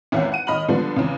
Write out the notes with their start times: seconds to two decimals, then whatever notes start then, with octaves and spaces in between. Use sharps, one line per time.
0.12 G#1 E2 C#4 E5 F#5
0.32 F#5 D#7
0.47 D#2 D#5 B5 F6 F#7
0.68 D3 F3 G3 B3 D4
0.96 E2 C#3